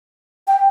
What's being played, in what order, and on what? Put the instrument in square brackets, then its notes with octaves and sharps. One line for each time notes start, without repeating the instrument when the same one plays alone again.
[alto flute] G5